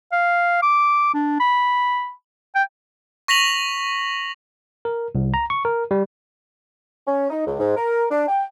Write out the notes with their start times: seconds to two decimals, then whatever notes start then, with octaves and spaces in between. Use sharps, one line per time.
0.12 F5
0.62 D6
1.14 D4
1.40 B5
2.55 G5
3.28 C#6 A#6 B6 F7 F#7
4.85 A#4
5.15 C2
5.34 A#5
5.50 C#6
5.65 A#4
5.91 G3
7.07 C#4
7.30 D#4
7.46 C#2
7.59 G#2
7.76 A#4
8.11 D4
8.28 G5